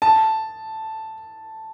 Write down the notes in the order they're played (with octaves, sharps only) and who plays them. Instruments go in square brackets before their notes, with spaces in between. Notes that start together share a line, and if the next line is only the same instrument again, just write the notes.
[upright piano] A5